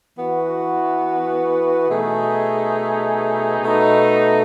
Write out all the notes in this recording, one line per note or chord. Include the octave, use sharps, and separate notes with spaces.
E3 B3 F#4
B2 A3 D#4 G#4
B2 A3 D#4 A4